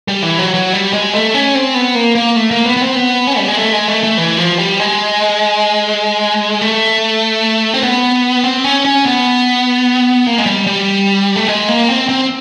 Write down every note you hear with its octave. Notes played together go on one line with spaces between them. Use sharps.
G3
E3
F#3
F#3
G3
G#3
A3
C#4
C4
B3
A#3
A#3
A3
A#3
B3
B3
C4
B3
C#4
G3
G#3
A3
G#3
A3
A3
E3
F3
G3
G#3
A3
C4
B3
C4
C#4
C#4
B3
A#3
G#3
G3
G3
A3
G#3
A#3
C4
C4